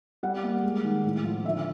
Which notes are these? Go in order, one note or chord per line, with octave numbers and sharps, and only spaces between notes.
G3 F#5
A#3
G#3
D#3
A2
F3
D3 E5